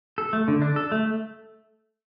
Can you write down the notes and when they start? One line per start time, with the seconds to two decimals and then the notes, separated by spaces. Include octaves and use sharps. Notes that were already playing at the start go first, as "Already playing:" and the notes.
0.18 A4
0.33 A3
0.48 D3
0.62 D4
0.76 A4
0.92 A3